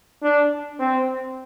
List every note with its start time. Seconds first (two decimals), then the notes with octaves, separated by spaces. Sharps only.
0.22 D4
0.79 C4